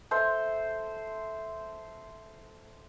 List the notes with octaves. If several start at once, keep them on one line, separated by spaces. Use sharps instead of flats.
A4 C5 E5